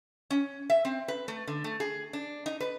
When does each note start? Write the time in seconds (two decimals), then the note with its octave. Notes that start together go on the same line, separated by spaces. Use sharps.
0.30 C#4
0.70 E5
0.85 C4
1.08 B4
1.28 A3
1.47 D3
1.64 A3
1.80 G#4
2.13 D4
2.46 D#4
2.60 B4